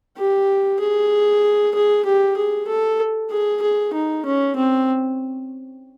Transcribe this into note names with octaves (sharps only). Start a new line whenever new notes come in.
G4
G#4
G#4
G4
G#4
A4
G#4
G#4
D#4
C#4
C4